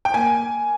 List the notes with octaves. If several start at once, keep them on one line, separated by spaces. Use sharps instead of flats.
G5
A#3 G#5